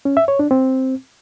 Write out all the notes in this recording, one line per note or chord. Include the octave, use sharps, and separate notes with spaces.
C#4
E5
C#5
D4
C4